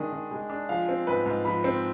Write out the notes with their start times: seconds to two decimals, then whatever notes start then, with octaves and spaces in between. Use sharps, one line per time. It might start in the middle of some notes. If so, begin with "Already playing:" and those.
Already playing: D#3 G#3 D4 D#6
0.12 D#3
0.31 G#3
0.50 D4
0.69 F3 F5
0.89 C4
1.07 G#2 B4
1.26 G#2
1.45 F3 B5
1.64 C4